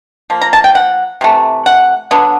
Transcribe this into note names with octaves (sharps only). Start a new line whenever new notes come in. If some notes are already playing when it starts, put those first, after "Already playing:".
F3 A#3
A#5
A5
G5
F#5
C3 E3 A3
F#5
D3 F#3 B3